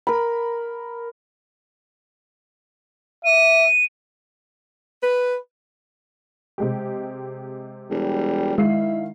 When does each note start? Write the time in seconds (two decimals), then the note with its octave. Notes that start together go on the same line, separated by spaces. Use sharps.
0.07 A#4 B5
3.24 E5 D#7
5.02 B4
6.58 C3 G#3 G4
7.90 E1 G3
8.58 D#3 G#3 E4 F5 C7